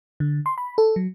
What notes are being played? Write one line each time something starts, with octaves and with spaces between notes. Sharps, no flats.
D3
C6
B5
A4
F#3